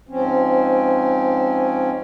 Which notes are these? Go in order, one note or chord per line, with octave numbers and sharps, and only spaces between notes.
G#2 F3 C4 C#4